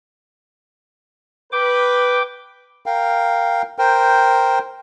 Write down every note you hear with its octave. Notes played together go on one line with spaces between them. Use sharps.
B4 G5 D6
A#4 F5 G5
A#4 C5 G5